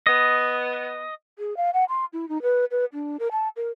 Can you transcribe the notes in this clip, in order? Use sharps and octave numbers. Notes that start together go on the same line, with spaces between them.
B3 D#5
G#4
F5
F#5
C6
E4
D#4
B4
B4
D4
A#4
A5
A#4